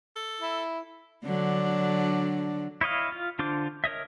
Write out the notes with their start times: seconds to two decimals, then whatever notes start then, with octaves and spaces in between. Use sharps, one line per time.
0.16 A4
0.41 E4
1.25 D3 F#3 D4
2.81 E4 C#5 D#5 F5
3.12 F4
3.39 D3 D4 F4 C5 D6
3.84 A#4 C#5 D#5 E5